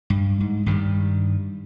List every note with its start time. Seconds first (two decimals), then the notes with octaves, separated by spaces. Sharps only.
0.10 G2
0.41 G#2
0.66 G2 D#3 E3 G3